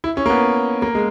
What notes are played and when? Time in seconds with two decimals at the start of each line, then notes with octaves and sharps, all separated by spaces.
0.04 E4
0.17 C#4
0.26 A#3
0.30 B3
0.82 A#3
0.95 G#3